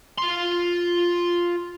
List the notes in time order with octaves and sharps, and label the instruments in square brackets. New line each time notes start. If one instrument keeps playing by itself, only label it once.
[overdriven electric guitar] F4 C6